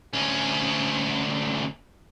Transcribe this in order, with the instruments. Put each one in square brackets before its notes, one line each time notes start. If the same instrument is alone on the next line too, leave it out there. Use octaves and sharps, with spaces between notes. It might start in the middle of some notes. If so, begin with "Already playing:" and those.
[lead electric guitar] D2 C#4